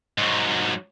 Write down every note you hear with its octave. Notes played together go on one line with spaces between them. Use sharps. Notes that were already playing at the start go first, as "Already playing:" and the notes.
G#2 F#3